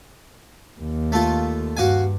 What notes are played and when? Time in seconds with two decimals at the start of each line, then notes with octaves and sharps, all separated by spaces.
0.81 D#2
1.12 A3 F4
1.77 G2 F#4 F5 G#5